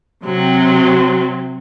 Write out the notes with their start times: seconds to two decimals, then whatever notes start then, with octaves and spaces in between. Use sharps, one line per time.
0.24 C3 F#3 C4